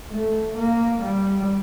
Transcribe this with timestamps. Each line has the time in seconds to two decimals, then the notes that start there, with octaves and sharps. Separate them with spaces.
0.11 A3
0.57 A#3
1.03 G3